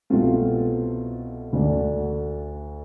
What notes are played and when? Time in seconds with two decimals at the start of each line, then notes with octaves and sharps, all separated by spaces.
0.10 C2 B2 A3 C4 F4
1.53 D2 D3 A3 D4